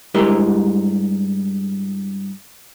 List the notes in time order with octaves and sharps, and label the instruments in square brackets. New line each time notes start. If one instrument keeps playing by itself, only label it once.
[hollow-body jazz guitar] G2 G#3 E4 G4 A#4 D#5